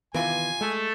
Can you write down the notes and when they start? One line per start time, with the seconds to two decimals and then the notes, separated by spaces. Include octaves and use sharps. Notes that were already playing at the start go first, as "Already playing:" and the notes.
0.14 C3 D#3 E3 B3 F4 G#5
0.61 G#3 A3 A4